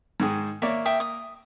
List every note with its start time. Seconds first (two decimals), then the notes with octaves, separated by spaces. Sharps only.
0.20 G#2 D#3 G#4
0.62 A#3 C#5 D5 E5
0.85 E5 G5 D#6
1.00 D#6